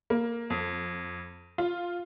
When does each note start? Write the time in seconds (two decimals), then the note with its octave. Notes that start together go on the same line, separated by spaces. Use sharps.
0.10 A#3
0.50 F2
1.58 F4